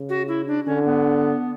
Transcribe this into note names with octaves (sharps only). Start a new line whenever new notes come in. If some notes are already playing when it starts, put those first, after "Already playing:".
Already playing: C#3
F#4
E4
D4
D3 C#4
B3